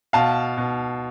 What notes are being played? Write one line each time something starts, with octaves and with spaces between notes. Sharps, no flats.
B2 F5 A5
B2